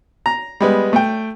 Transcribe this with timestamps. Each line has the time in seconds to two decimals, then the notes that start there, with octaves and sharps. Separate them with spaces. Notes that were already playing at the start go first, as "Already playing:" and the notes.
0.26 A#5
0.61 G3 G#3 B3
0.93 A3 G5